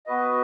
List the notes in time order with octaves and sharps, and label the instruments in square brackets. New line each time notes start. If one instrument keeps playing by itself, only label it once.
[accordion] B3 F#4 B4 D#5